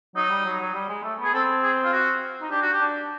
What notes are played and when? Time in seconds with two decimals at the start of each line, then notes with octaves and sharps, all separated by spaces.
0.15 F#3 D#4
0.30 G3
0.45 F#3
0.60 F#3
0.74 G3
0.89 G#3
1.04 A3
1.19 B3
1.24 G#4
1.34 C4 A4
1.62 G#4
1.84 F4
1.93 F#4
2.42 D#4
2.51 D4 G4
2.62 F#4
2.73 G4
2.81 D4